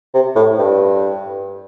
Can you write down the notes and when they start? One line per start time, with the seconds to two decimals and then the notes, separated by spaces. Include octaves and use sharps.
0.14 C3
0.36 A2
0.58 G2